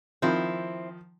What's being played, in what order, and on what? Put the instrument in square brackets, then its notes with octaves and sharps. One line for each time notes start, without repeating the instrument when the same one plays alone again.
[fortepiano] D#3 F3 [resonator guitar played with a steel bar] C4 E4